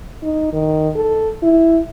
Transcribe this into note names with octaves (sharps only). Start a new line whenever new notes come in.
D#4
D#3
A4
E4